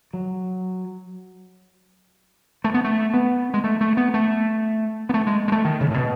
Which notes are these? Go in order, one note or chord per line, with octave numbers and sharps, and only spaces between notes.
F#3
A3
B3
A3
B3
G#3
A3
A3
B3
A3
B3
A3
G#3
G#3
A3
D#3
C#3
A2
B2